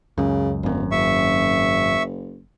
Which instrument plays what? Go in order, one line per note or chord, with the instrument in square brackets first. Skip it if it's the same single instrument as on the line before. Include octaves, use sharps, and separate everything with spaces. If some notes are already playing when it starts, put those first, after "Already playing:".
[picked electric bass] C#2 F#2 [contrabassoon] C#3
[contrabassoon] D1 [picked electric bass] G#1 F#2
[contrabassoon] F#1 [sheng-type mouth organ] E5 C#6